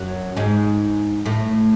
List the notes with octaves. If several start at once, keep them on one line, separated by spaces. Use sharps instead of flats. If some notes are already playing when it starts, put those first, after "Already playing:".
Already playing: F#2 F#3
G#2 G#3
A2 A3